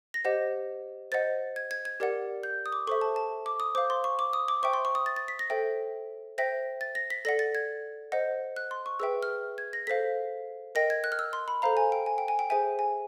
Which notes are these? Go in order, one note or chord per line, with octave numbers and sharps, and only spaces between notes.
A#6
G4 C5 D#5 F#5
C5 D#5 F#5 A6
G#6
G#6
G#6
G4 A#4 D5 F#5
G6
D#6
D6
A4 C5 E5 C#6
A5
A5
D6
D#6
C5 F5 D6
C6
C#6
D6
D#6
D6
C5 E5 G5 C#6
C6
C#6
D#6
A6
A6
B6
A#6
A4 C5 E5 G5
C5 E5 G5 A#6
A6
A#6
B6
A4 D5 F#5 A#6
A6
G#6
C5 D#5 F#5
F#6
C6
C#6
G#4 B4 E5 G5 E6
F6
G#6
A#6
A4 C5 F5 B6
A#4 D#5 G5 A#6
G#6
F#6
F6
E6
C6
B5
A4 C5 F5 A#5
G#5
G5
G#5
G5
G#5
G5
G#4 C5 E5 G#5
G#5